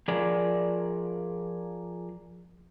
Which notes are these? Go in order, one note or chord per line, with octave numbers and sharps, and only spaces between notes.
F3 G#4 A#4 D5